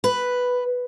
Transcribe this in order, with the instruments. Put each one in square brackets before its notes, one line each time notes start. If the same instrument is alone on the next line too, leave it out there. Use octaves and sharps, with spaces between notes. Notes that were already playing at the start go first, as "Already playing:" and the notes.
[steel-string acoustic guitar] B4